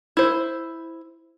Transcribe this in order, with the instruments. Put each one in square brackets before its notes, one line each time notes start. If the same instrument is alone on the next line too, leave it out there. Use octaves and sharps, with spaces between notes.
[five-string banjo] E4 C5